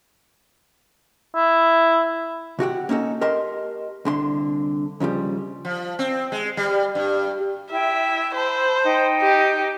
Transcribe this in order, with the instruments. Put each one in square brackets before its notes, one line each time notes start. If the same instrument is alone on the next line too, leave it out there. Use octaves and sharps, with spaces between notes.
[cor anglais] E4
[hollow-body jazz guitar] C3 F#4 G4 F#5
A#3 C#4 D#4 A4
G4 A#4 D#5 A5 C6
C2 D3 C6
D#2 C#3 F3 G3
[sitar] F3
C4
G#3
G3
G2
[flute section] E4 G5 [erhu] E5
[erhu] C5 [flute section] A5 B5 E6
[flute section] D#4 G5
[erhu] G4